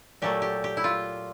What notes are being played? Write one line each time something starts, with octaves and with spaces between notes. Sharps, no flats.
A#2 F#3 A3 G4
G4
G4
E4
F4